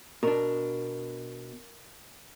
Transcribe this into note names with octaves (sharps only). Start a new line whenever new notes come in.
B2 D4 A#4